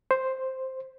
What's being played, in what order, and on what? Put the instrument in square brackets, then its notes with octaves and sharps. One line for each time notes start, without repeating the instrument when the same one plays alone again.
[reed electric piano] C5